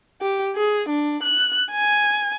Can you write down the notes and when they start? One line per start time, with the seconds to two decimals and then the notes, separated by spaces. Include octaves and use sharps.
0.21 G4
0.56 G#4
0.89 D4
1.23 F#6
1.71 G#5